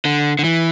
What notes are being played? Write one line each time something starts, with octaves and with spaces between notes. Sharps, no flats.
D3
D3
E3